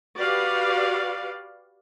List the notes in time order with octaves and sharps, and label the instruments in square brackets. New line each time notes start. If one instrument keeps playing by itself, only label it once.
[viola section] F#4 G4 B4 D5 F5